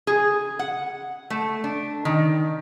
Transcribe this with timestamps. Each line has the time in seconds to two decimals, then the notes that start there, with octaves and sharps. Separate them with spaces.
0.07 G#4
0.59 F#5
1.30 A3
1.64 D4
2.05 D#3